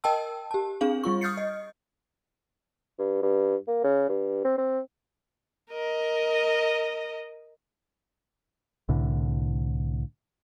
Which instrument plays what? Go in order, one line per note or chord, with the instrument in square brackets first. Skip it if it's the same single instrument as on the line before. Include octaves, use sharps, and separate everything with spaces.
[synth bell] A#4 D#5 G5 A5 E6
G4 A5
C4 D4 G#4 F5 F#7
G3 F4 C#6
D#6 F6 G6 A6 C7 C#7
D#5
[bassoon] G2
G2
A#3
C#3
G2
C4
C4
[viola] A#4 D#5
[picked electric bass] C2 A2 D3